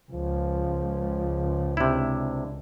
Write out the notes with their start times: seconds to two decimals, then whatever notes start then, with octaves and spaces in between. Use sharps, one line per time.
0.12 C#2 F3
1.77 C3 D4 E4